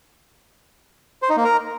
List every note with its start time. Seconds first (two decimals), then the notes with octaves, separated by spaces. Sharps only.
1.22 C5
1.30 D#4
1.37 A#3
1.44 A#4